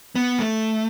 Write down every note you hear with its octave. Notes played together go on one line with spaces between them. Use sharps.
B3
A3